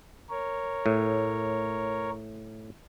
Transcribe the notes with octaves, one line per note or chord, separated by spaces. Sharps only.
A#4 C#5
A2